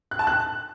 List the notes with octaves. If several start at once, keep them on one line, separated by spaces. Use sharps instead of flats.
F#6
A5
F#6